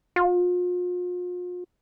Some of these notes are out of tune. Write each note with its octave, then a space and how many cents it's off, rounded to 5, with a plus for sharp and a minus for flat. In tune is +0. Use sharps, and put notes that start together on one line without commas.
F4 +40